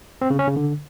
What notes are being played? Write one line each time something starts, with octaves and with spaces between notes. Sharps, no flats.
C4
C#3
C#4
C#3
D3